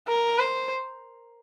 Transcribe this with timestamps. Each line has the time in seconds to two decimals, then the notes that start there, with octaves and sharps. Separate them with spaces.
0.08 A#4
0.39 C5